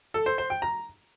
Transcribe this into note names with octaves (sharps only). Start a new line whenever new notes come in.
A4
C5
C5
G5
A#5